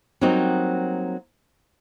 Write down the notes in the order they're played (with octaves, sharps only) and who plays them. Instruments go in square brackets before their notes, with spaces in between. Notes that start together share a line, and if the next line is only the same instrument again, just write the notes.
[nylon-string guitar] F#3 G3 A#3 C4 D#4 F#4